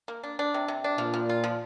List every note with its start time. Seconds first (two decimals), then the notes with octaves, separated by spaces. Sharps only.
0.08 A#3
0.23 D4
0.39 D4
0.54 C3
0.68 C3
0.84 D4
0.98 A#2 F3
1.14 F3
1.29 F4
1.44 F3